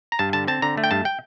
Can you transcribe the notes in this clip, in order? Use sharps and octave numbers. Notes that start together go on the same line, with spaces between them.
A#5
G2 A5
D3 A5
C4 A5
D3 A#5
A3
G5
G2 A5
G5